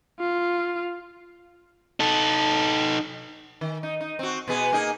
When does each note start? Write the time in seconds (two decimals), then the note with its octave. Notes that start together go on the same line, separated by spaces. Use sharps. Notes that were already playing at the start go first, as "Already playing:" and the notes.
0.20 F4
2.00 D#4 A4
3.61 D#3
3.83 D#4
4.01 D#4
4.19 C4 F#4
4.48 B2 B3 G#4
4.72 A#3 D#4 G#4